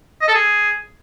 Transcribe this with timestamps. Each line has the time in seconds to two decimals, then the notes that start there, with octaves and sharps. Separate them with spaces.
0.21 D#5
0.28 A4
0.35 G#4